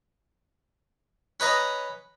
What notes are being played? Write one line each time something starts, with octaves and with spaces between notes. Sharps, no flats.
C#4 B4 D#5 A#5 B5